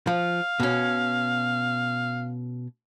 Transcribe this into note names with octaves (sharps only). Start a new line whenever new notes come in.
F3 F5
B2 C#4